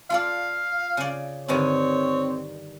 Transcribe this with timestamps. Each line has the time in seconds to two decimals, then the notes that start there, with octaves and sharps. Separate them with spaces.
0.10 F4 A4 D5 F5
0.97 C#3 D5
1.48 G2 D3 D#3 C4 C#5